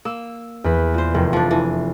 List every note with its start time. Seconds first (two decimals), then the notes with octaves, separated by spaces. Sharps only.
0.05 A#3 E6
0.64 E2 B4
0.94 A#2 C5
1.14 F1 D#3
1.33 F3 D4
1.51 E3